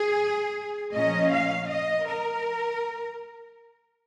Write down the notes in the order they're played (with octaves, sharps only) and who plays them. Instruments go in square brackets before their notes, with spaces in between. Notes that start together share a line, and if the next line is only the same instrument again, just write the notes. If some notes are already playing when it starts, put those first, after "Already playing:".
Already playing: [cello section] G#4
A#2 F3 C#4 D#5
F5
D#5
A#4